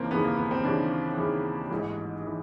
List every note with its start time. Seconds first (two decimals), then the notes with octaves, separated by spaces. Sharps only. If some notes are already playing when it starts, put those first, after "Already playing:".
Already playing: D#2 C#3 E3 A#3 C4
0.11 D#2 C#3 E3 B3
0.24 A#3
0.37 B3
0.51 C4
0.64 D#2 C#3 E3 D4
1.17 D#2 C#3 E3
1.71 A1 G#2 E3
2.27 E3